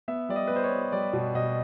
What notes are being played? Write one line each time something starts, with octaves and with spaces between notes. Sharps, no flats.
B3 E5
G3 D5
D#5
B3 B4
C5
C#5
B3
G3 D5
B2
B2 D#5